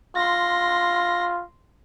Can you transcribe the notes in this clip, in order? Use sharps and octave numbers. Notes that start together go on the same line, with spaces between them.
F4 C6 A#6